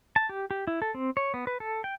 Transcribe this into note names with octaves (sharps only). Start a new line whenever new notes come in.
A5
G4
G4
E4
A4
C4
C#5
B3
B4
A4
G5